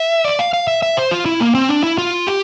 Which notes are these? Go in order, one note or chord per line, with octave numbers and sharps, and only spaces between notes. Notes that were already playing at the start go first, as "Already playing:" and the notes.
Already playing: E5
D5
F5
F5
E5
E5
C5
F4
E4
A#3
C4
D4
E4
F4
G4